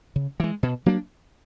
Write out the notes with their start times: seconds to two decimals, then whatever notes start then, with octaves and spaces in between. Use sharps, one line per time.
0.16 C#3
0.40 E3 G#3
0.63 B2
0.86 F#3 A#3 D4